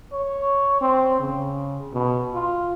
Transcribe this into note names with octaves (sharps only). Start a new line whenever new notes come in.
C#5
C4
C#3
B2
F4